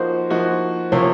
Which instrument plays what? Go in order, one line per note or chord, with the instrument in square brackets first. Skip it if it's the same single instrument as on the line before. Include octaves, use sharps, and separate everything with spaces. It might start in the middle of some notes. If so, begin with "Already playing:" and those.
Already playing: [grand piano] F3 A#3 D#4 F#4 [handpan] C5
[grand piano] F3 A#3 D#4 F#4
[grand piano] C3 F3 A#3 [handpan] C#5